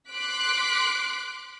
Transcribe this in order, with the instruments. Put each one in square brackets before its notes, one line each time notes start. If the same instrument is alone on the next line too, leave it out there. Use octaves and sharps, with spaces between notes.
[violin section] C6 D6 F#6 B6 D7